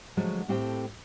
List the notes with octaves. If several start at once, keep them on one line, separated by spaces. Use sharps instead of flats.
D3 F3 F#3 G#3 A3 F#4
A2 A3 C4 G4 C5 G5